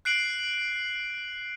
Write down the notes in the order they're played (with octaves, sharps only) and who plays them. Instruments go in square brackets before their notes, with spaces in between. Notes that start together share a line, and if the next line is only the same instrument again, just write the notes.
[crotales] F#6 C7 D7 F#7